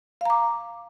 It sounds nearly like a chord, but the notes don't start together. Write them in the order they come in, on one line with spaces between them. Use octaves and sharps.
F5 A#5 D6